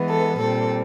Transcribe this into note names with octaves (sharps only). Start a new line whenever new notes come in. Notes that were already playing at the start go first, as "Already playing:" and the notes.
Already playing: E3 G#3 B3
A4
A#2 G3 C4 A4